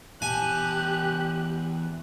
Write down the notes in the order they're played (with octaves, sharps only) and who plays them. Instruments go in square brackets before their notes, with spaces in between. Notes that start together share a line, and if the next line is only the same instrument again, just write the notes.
[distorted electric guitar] E2 A5 [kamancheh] G4 F#6 [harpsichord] G#5